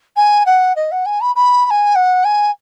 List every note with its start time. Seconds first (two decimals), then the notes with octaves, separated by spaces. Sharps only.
0.16 G#5
0.46 F#5
0.75 D#5
0.91 F#5
1.05 G#5
1.21 B5
1.35 B5
1.65 B5
1.70 G#5
1.95 F#5
2.24 G#5